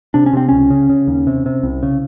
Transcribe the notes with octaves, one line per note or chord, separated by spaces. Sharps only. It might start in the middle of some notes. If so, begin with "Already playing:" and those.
C3 D4
C#4
C3 C4
C#2 C#4
C#3
C#3
D#2
C3
C3
C2
C#3